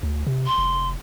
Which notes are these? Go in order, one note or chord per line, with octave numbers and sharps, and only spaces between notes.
D2
C3
C6
F1